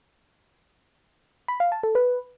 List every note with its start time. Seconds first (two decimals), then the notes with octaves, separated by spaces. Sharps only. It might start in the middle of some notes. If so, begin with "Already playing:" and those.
1.48 B5
1.60 F5
1.72 A5
1.83 A4
1.95 B4